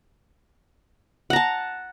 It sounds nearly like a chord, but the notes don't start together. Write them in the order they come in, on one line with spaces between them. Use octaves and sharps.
F#5 A#5 A5